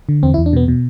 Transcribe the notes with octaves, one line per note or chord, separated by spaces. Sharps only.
D3
E2 C4
E4
E2
D4
B2 B3
B2